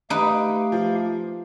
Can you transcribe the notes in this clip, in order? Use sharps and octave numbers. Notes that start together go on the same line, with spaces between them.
A3 D#4 G4 B4 F5 D7
F3